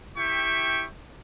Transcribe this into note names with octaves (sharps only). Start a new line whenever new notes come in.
E4 G4 E5 G5 C#6